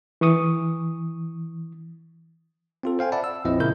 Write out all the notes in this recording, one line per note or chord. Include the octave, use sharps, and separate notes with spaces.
E3 C#6 D#6
C4 F4 A4
C5 F5 G5 G#5
D5 E5 F#5 A5 B5
E6
A#1 F2 F3 C4 E4 D#5
A#2 C#3 E4 A#4 G6